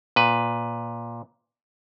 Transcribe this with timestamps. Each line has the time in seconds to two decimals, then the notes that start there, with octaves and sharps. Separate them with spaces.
0.16 A#2 B4